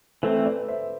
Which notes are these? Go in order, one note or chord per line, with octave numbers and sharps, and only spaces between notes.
E3 A3 C4 A4 C5
B4 D5
C5 E5